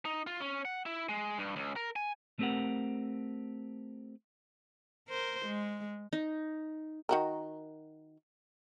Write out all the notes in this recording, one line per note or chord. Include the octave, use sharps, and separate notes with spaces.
D#4
F4
C#4
F#5
E4
G#3
G2
C#2
A#4
G#5
A3 C4 G4 A#4 F#5
A#4 C5
G#3
D#4
D#3 F#4 A#4